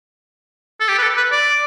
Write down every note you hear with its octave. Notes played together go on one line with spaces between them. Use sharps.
A4
G4
B4
A4
B4
D5